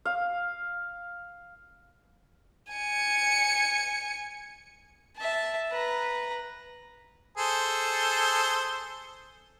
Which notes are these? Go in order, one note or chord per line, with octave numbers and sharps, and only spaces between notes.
F5
G#5 C#7
E5 A5
B4 A#5
G#4 A4 C5